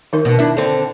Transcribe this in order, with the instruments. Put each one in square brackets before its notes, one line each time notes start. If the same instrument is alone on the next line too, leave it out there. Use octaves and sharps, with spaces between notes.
[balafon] D#3 D#4 A#4
[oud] B2
D4 E4
D3 C4